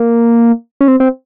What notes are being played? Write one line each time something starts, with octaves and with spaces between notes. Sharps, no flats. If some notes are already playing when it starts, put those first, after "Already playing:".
Already playing: A#3
C#4
C4
C4